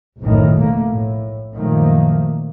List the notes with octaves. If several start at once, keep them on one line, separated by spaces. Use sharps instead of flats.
F#1 B1 F2 A2 D#3
A3 A#3
A2
F#2 A#2 D#3 F3 A3 A#3